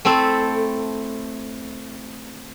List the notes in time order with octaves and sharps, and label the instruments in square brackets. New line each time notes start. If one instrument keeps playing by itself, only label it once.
[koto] A3 C4 E4 A4